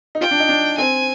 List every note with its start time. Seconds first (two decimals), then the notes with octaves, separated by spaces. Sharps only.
0.15 D#4
0.21 F4 G5
0.31 D4
0.40 D#4
0.49 D4
0.78 C4 G#5